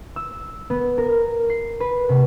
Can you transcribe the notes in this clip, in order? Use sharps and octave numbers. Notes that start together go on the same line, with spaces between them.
E6
B3
A#4
C7
B4
C3